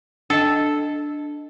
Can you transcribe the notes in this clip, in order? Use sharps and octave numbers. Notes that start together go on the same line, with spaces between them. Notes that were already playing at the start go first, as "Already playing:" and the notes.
D4 A4 D#5